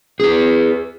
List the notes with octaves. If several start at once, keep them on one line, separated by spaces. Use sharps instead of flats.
G#4 B4